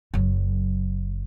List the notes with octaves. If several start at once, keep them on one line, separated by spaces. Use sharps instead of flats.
F#1 F#3